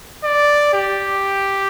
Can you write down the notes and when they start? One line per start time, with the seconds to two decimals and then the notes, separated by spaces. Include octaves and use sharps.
0.24 D5
0.74 G4